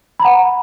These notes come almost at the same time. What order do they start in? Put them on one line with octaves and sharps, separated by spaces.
B5 A#5 F#5